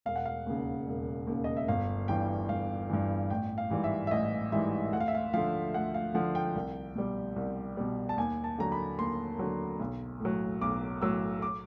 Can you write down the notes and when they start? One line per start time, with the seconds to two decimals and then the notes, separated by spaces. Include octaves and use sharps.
0.06 E1 F5
0.16 F#5
0.26 F5
0.47 D#2 C#3
0.87 E1
1.27 D#2 C#3
1.44 D#5
1.57 E5
1.68 G1 F5
2.08 G2 E3 G5
2.49 G1 F5
2.90 G2 E3
3.30 A1 G5
3.58 F5
3.70 G#2 E3 G3
3.84 E5
4.07 E5
4.11 A1 D#5
4.52 G#2 E3 G3 E5
4.92 D2 F#5
5.00 F5
5.08 E5
5.15 F5
5.34 D3 F3 F5
5.74 D2 F#5
5.94 F5
6.14 D3 F3 F#5
6.35 G5
6.55 C2
6.95 B2 G3
7.36 C2
7.77 B2 G3
8.09 A5
8.17 D#2 G#5
8.44 A5
8.58 D3 F#3 A#5
8.72 B5
8.99 D#2 C6
9.39 D3 F#3
9.79 B1
10.20 A2
10.25 F#3
10.61 B1 D6
11.01 A2 F#3 E6
11.42 D6